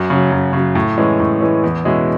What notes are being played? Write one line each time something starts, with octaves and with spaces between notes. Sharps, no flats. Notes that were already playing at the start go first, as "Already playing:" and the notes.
Already playing: F#2
C#3 F#3
F#2
C#3 F#3
A2
E3 G#3 C#4
A2
E3 G#3 C#4
E2
B2 G#3 C#4 E4